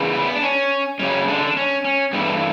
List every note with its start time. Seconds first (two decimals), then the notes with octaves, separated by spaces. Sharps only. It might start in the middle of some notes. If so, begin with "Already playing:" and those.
Already playing: E2 C#3 E3
0.14 B3
0.35 D4
0.43 C#4
0.99 F#2 C#3 G3 C#4
1.28 D3 D4
1.47 D4
1.57 C#4
1.85 C#4
2.13 G2 E3 A3 B3